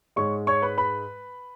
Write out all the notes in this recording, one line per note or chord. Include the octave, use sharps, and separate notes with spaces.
G#2 G#3 C#5 C#6
C#5 C#6
B4 B5
B4 B5